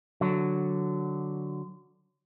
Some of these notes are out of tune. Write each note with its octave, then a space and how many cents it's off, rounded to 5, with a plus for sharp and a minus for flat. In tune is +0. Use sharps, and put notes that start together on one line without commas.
D3 +0 F#3 +0